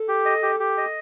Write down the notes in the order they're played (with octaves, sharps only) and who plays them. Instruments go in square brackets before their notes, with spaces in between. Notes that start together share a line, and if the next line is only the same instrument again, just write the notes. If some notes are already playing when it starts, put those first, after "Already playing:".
Already playing: [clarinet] A4
[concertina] G4
D#5
G4
G4
D#5